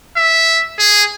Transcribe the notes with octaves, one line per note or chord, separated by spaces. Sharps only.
E5
G#4